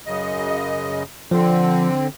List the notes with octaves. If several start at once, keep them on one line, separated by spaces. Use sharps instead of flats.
F#2 C#3 D#5
D3 F3 C4